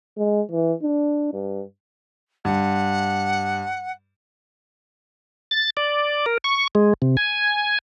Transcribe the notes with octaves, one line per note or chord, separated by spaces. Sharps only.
G#3
E3
D4
G2
G2 F#5
A6
D5
A#4
C#6
G#3
C3
G#5